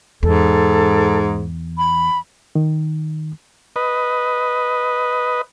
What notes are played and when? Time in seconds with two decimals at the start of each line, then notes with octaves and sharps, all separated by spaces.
0.23 E2 G#2 A4
1.78 B5
2.55 D#3
3.76 B4 D#5